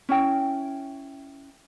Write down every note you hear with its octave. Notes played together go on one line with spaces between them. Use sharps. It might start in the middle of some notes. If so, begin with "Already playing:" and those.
C#4 E4 G5